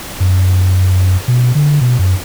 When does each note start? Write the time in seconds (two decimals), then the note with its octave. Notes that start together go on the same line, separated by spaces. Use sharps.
0.20 F#2
1.28 B2
1.55 D3
1.81 B2
1.99 F#2